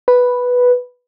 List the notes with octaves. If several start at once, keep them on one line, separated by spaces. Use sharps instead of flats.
B4